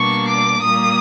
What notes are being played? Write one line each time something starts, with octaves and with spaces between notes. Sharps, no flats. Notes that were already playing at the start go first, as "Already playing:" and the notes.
Already playing: B2 G3 A#3 D4 C#6
D6
A#2 G3 A#3 D#6